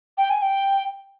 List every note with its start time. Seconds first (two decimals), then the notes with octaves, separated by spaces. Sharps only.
0.18 G5
0.30 G#5
0.42 G5